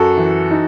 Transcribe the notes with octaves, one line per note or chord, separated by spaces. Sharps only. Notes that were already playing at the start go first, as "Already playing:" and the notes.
Already playing: F#2 F#4 A4
E3
D#4